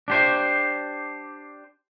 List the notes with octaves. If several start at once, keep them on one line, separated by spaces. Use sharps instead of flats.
D4 G4 C5